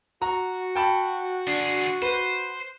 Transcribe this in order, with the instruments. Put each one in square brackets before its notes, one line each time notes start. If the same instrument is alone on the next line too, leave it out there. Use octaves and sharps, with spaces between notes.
[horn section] F#4 [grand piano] A#5
[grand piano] G5 A5 B5
[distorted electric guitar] D3 G#4 [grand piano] D4
[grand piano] B4 [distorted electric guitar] C5